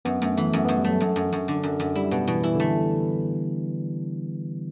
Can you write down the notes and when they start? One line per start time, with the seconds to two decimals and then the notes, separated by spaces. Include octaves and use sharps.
0.05 F#2 B3
0.21 F#2 A3
0.37 E3 A3
0.53 F#2 A3
0.65 F#2 B3
0.77 G3
0.84 F#3 A3
1.00 F#2
1.16 F#2
1.33 F#2
1.48 D3
1.63 F#2
1.80 F#2
1.95 G3 E4
2.11 B2 B3
2.28 B2 E3
2.43 E3 E4
2.55 D3 A3